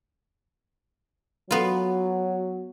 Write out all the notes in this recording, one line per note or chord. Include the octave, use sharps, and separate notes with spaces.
F#3 B3 F4